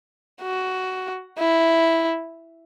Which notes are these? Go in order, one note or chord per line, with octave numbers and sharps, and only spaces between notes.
F#4
E4